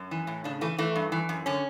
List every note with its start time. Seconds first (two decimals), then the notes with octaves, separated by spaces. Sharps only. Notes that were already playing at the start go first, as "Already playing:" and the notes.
Already playing: F#2
0.11 E3
0.27 A2
0.44 C#3 D4
0.61 E3 A3
0.78 E3 A3
0.96 G2
1.12 E3
1.29 F#2
1.46 D3 C#4